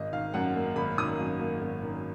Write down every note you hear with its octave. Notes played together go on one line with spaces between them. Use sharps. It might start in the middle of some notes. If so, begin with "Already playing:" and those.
Already playing: G#1 D#5
D#3 F5
F#2 F#5
A#3
G#1 B5
D#3 D#6
F#2
A#3
G#1
D#3